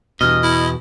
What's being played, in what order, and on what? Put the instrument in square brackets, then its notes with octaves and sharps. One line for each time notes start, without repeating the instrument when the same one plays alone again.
[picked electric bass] E2 B2 [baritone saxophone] G2 [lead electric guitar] D#5 [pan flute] F6
[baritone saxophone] E4